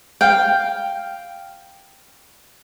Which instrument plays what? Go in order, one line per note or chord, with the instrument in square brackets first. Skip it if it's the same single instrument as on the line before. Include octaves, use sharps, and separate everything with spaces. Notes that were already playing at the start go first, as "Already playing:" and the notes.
[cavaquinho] F5 G5